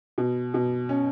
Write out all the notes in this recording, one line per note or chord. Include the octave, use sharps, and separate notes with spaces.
B2
B2
C#4